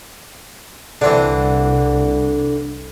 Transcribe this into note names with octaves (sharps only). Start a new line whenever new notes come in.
C2 D3 E3 C4 D4